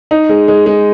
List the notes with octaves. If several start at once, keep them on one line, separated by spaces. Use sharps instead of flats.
D#4
G#3
G#3
G#3